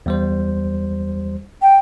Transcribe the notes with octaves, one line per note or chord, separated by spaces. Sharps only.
E2 G3 C5
G5